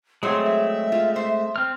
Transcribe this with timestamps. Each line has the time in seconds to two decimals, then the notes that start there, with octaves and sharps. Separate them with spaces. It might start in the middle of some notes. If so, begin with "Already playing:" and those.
0.23 F#3 G#3 A3 C4 G#4 C#5 C6
0.44 E5
0.92 F4
1.16 C5
1.56 C4 F6